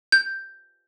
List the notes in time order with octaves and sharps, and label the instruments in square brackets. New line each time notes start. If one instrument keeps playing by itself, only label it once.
[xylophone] G6